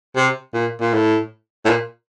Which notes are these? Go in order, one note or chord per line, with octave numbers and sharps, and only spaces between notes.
C3
A#2
A#2
A2
A2
A#2